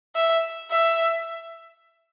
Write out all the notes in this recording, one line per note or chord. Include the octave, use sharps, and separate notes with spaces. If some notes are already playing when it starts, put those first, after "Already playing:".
E5
E5